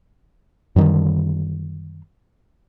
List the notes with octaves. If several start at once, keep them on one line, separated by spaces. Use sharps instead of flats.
F#2 D3 D#3 G3